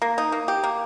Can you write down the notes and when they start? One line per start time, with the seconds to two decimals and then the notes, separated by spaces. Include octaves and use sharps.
0.02 A#3
0.18 D#4
0.32 A#3
0.48 G4
0.64 A#3